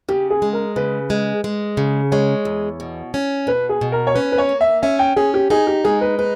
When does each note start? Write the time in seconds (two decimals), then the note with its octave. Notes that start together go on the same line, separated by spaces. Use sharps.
0.09 C#3 G4
0.30 G#4
0.42 G#3
0.53 A#4
0.76 C#3 B4
1.10 G#3
1.44 G#3
1.77 C#3
2.12 G#3 C#5
2.45 E2
2.80 B2
3.14 C#4
3.47 B2 B4
3.69 G#4
3.81 B2
3.92 A#4
4.07 C#5
4.15 C#4 B4
4.32 B4
4.38 C#5
4.49 A#3
4.61 E5
4.82 C#4 E5
4.99 G5
5.16 C#4 G#4
5.34 G4
5.50 D#4 G#4
5.67 G4
5.84 G#3 G#4
6.01 B4
6.18 D#4 B4